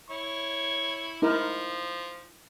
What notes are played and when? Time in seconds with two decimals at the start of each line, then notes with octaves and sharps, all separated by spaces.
0.10 E4 C#5 C#6
1.22 F3 D#4 E4 A#4